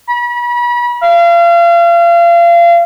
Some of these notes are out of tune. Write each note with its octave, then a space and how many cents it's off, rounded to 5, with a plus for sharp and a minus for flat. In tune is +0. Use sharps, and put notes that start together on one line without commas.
B5 -35
F5 -35